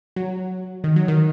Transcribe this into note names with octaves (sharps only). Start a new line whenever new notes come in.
F#3
D#3
F#3
D#3